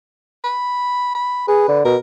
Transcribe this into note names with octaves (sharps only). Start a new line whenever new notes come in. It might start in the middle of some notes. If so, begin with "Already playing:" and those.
B5
B5
G#4 B4
D3
B2 A#4